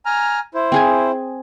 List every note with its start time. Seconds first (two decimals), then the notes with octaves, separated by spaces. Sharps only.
0.06 G#5 A#5 F6
0.54 E4 C5
0.72 C4 G#4 G#5